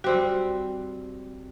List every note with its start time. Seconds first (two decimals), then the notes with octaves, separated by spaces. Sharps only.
0.04 G3 C4 F#4 G4